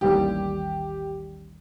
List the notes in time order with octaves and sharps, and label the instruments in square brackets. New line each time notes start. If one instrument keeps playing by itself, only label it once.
[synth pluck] A1 D#2 G3 [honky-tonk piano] G4